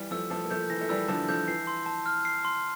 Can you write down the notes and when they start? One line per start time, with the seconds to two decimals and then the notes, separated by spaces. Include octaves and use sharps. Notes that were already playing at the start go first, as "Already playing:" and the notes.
Already playing: E3 G3
0.11 F3 A3 E6
0.30 F3 A3 A5
0.45 A#3
0.51 F3 A3 G6
0.70 E3 A#6
0.81 A3
0.89 E3 G3 E6
1.08 D3 F3 A5
1.28 D3 F3 G6
1.47 E3 C7
1.67 C6
1.86 A5
2.06 F6
2.25 C7
2.45 C6